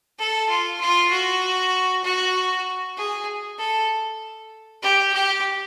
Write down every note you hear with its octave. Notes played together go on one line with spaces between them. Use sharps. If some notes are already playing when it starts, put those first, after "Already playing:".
A4
F4
F4
F#4
F#4
G#4
A4
G4
G4